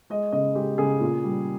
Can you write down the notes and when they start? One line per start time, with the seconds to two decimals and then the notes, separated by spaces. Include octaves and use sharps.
0.10 G#3 D#5
0.32 C#3 D#5
0.55 G#3 G4
0.78 C#3 G#4
1.01 A#2
1.24 G3